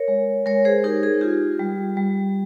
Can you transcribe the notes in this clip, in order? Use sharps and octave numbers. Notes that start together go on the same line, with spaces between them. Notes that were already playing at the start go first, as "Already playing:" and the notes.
Already playing: A#4 C#5
G#3
G#3 A#4 C#5
G#4 C5
D#4 G4 A#4
G#4
F4 G4
G3
G3